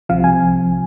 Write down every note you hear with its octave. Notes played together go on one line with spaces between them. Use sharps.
C2 C3 F3 F5
G#5